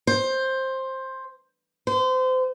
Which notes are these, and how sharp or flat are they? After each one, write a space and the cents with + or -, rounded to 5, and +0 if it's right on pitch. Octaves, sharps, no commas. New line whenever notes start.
C5 +10
C5 -30